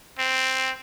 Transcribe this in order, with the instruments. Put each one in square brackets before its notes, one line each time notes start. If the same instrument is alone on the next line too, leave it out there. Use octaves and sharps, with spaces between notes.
[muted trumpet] C4